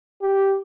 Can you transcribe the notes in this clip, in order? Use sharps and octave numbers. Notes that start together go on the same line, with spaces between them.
G4